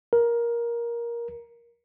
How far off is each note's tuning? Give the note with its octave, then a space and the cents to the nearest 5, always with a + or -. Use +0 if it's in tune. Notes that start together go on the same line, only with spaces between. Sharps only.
A#4 +15